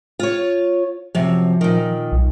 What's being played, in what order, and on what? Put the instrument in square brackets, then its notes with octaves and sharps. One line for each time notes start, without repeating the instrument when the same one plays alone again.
[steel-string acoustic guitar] F4 C#5
[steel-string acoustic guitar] F#2 C3 [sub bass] F3
[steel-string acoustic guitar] A#2 D#3
[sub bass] B1